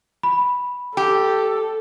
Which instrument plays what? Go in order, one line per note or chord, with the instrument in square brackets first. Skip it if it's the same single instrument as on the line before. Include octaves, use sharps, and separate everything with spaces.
[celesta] B5
[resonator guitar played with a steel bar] G4 [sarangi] A4